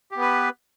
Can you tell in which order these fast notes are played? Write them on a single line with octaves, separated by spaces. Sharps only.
G4 B3 B4